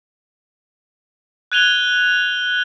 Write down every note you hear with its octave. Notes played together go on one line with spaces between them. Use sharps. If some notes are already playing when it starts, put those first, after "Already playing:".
F#6 G#6 D#7 F7 G7